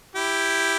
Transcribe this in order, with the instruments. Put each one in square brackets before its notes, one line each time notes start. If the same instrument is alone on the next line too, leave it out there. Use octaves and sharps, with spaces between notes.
[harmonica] E4 G4